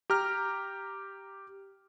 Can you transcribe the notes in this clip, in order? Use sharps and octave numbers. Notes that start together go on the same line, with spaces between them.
G4 A#5 F6